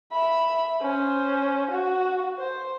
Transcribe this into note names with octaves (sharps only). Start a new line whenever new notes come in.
E5 B5
C#4 C5
F#4
C5